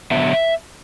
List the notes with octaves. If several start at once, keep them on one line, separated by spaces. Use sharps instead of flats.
D3 F#3 B3 E5